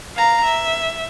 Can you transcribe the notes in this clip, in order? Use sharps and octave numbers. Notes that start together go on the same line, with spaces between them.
F5 A#5
E5